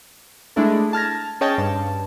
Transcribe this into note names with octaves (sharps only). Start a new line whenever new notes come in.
G#3 A3 D4 E4 A4
A5 F6 G#6 A#6
C#4 G#4 C#5 D#5 G5 A5
G2 A5